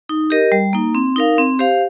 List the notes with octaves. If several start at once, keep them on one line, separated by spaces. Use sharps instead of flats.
D#4
G4 A#4 D#5
G3
A#3 D#4
C4
D#4 A#4 F5
C4
G4 C5 F5